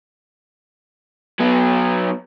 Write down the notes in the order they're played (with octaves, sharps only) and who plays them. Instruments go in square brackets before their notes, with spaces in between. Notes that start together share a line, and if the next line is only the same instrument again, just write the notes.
[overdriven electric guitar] F#3 B3